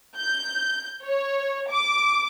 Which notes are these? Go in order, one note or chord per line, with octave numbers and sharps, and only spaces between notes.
G6
C#5
D6